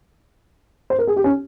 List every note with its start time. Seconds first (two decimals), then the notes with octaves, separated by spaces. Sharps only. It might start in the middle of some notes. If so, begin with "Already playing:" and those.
0.90 C5
0.99 A#4
1.07 G#4
1.16 G4
1.24 C#4